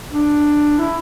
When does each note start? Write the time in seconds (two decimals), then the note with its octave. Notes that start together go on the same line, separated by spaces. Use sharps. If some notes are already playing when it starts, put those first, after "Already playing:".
0.10 D4
0.78 E4